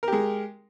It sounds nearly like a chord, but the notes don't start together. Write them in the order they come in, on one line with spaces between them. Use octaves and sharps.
A#4 G4 G#3